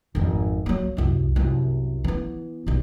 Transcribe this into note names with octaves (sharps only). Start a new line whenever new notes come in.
G#1 F2
F#3 A#3
C2 F#2
C2 F#2
E3 B3
B1 G3